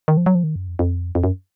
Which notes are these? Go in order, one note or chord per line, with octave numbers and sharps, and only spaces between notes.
D#3
F3
F#3
F3
D#3
F#2
F2
F2
F2
F#2